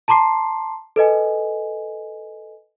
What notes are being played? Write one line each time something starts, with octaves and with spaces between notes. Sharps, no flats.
A5 A#5 C6 D6 C7
A4 B4 D#5 G#5